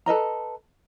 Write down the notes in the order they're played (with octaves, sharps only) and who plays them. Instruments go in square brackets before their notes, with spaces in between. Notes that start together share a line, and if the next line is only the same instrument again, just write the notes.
[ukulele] A4 B4 D#5 A#5